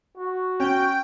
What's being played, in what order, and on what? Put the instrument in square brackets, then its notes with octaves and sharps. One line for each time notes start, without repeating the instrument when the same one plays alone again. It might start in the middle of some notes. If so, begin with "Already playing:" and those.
[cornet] F#4
[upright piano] C#4 [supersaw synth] G5